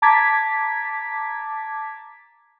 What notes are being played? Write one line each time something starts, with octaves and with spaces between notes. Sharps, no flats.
A5 A#5 D6 G#6 A6 B6